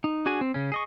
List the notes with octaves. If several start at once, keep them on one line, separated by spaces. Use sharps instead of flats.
D#4
D4 F#4 G#4 G#5
C4
C#3 C#4
G#4 D#5 C#6